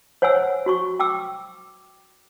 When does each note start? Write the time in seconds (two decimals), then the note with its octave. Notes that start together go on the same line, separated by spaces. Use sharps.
0.22 C5 C#5 F#5 G#5 E6
0.66 F#4 C6 C#6
0.99 G5 D6 E6